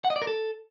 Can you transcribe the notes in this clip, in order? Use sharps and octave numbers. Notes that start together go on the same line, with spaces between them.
F#5
D#5
D5
A#4
A4